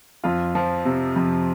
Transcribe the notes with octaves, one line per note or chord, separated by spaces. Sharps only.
F2 F4
F3
C3
F2